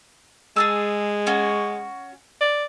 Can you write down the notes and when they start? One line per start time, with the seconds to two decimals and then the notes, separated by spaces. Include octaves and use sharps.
0.56 G#3 G#4 A5 E6
1.27 C#4 F#4
2.41 D5